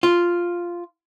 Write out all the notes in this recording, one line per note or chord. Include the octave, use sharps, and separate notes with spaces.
F4